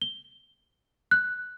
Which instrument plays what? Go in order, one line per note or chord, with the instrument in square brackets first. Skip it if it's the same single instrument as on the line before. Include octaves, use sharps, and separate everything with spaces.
[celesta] G7
F#6